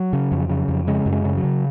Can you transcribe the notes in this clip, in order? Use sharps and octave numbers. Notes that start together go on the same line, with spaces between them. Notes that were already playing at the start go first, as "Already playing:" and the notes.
Already playing: F#3
C#3
F2
C#3
F2
C#3 G#3
F#2
G#3
C#3
F#3
C#3